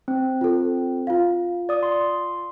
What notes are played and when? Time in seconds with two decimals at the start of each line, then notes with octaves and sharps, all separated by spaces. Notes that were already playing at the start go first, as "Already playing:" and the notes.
0.08 C4
0.41 F4 A4
1.07 F4 F5
1.69 D5 D#6
1.83 C6